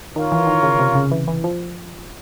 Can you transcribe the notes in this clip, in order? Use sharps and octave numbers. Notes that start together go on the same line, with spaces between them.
D#3 F4 A#4 C#5 F5
E3
D#3
C#3
C3
C#3
E3
E3
F3